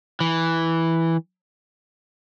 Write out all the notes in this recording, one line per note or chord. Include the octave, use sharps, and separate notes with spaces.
E3